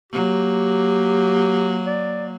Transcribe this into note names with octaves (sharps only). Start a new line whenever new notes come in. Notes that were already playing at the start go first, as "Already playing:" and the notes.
F#3 A#3 G4
D5